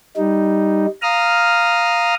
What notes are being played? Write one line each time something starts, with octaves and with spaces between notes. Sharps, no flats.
G3 D#4
F5 A#5 D#6 F6